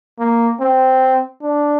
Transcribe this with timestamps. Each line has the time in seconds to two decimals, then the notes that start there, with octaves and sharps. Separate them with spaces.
0.19 A#3
0.60 C4
1.43 D4